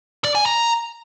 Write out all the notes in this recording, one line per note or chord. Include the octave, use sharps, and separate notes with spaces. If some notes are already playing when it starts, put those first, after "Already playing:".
D5
G#5
A#5